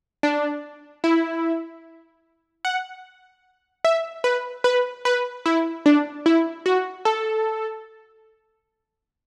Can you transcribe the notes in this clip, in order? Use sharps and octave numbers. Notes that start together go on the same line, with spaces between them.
D4
E4
F#5
E5
B4
B4
B4
E4
D4
E4
F#4
A4